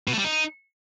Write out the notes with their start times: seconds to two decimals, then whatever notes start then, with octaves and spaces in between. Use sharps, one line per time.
0.08 B2
0.13 A3
0.19 G3
0.24 D#4